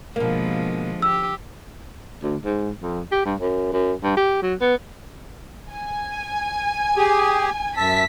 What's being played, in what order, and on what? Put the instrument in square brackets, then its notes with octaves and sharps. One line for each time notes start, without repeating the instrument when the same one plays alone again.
[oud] B2 A#3 [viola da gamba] D3 F3 G#3
[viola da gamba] G4 [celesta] E6
[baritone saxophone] D2
G#2
F2
G4
G2
F#2
F#2
G2
G4
F#3
B3
[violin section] G#5
[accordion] G4 G#4
[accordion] F#2 E5 A5 [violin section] B6